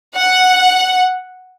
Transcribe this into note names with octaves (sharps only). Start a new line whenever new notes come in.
F#5